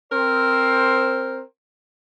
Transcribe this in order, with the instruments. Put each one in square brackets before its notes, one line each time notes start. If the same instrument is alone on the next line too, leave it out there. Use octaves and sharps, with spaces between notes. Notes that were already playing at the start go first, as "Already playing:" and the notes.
[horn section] C4 A#4 C5